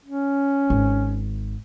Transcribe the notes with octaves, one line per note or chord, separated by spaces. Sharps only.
C#4
G#1